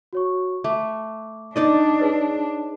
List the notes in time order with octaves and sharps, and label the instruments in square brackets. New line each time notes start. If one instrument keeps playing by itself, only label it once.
[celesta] F#4 C#5 C#6
[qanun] A3 [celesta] D6
[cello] D4 [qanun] D#4 D5 D#5
[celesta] G#4 B4 C#5